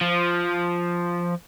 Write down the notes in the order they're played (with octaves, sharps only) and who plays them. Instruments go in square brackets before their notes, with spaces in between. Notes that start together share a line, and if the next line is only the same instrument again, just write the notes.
[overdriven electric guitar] F3